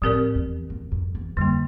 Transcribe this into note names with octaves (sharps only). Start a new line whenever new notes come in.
A2 F3 C4 G4 A#4 D5
E2
E2
F2
E2
F2 D3 G3 A#3